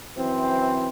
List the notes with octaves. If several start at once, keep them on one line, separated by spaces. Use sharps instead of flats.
F#2 E3 C4